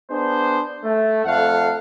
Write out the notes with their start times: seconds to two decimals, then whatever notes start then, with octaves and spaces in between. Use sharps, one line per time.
0.10 B3 D4 G#4 C5
0.84 A3
1.25 F2 A3 A4 F5 F#5